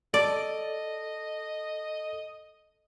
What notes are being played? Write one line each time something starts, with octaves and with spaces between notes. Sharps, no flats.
A4 D5 D#5